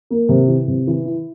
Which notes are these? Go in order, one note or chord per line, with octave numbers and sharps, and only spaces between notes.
A#3
C3
E3
C3
E3
E4